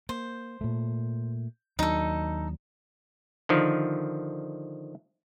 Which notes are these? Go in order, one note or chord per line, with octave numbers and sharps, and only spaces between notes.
A#3 C5
A#2 A3
D#2 F#3 D4 D#4 A4
D3 D#3 F3